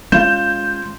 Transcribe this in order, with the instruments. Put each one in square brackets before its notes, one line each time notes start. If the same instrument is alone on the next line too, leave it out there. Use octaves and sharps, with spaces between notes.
[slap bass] G#3 C#4 [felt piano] F4 E7 [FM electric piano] G6